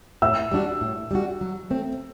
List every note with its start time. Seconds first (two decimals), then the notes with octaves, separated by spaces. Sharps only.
0.22 A2 E5 E6
0.51 G3 D4 F#4
0.81 A2
1.11 G3 D4 F#4
1.41 F#3
1.70 A3 C4